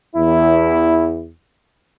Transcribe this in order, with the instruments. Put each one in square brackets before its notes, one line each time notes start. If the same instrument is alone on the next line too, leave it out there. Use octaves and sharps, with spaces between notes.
[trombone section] E2 E4